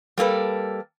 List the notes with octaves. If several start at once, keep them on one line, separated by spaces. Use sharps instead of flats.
G3 A#3 A4 B4